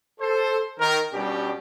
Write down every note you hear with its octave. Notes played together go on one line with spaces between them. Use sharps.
A4 C5
D#3 A#4
B2 G3 C#4 D4 G4